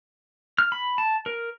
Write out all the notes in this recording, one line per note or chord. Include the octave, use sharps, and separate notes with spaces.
F6
B5
A5
A#4